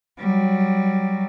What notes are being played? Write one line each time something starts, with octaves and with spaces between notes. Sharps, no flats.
F#3 G3